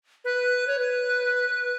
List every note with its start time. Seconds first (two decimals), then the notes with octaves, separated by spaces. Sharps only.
0.25 B4
0.68 C#5
0.79 B4